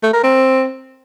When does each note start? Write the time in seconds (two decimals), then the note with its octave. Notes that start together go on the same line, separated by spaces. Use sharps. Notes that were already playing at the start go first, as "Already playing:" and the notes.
0.03 A3
0.13 A#4
0.23 C4